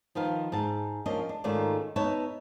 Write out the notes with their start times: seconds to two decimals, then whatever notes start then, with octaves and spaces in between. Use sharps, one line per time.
0.15 D#3 F3 B4 F5
0.52 G#2 A5
1.06 F3 A#3 C#4 D4 D#5
1.29 D4
1.44 G#2 D#3 A3 C#4 F4 D5
1.96 B3 D#4 B4 C#5 E5 A5